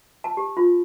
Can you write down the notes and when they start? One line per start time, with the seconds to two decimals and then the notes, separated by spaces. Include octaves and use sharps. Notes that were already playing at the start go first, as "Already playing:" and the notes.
0.24 A5
0.37 G4
0.57 F4